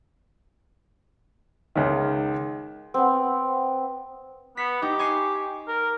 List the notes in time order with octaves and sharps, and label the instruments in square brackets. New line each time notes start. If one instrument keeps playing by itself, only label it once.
[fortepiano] C#2 D#3
[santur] B3 C4
[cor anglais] B3 [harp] B6
[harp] D#4 [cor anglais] G4
[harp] G#5 C#6 C7
[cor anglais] A#4